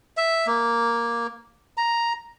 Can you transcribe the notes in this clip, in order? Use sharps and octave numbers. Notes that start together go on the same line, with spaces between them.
E5
A#3
A#5